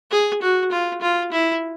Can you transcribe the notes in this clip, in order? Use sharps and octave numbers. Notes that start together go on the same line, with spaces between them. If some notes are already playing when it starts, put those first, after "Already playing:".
G#4
F#4
F4
F4
E4